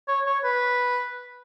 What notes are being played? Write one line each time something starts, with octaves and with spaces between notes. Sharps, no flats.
C#5
C#5
B4